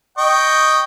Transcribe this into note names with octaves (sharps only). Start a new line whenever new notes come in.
D#5 G5 C#6